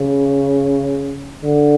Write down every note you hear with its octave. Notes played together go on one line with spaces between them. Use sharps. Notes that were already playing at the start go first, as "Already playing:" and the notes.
Already playing: C#3
D3